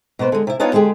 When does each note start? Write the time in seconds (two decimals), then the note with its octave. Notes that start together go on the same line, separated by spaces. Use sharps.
0.19 B2 A#3 B3 C5
0.32 D3 G#3
0.47 C3 E4
0.60 B3 D4 D#4 F4 C#5 F5
0.73 D3 G#3 G4 G#4